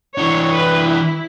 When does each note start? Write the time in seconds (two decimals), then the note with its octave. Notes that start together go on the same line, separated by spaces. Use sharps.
0.18 E3 D4 C#5
0.53 E4 B4
0.88 E4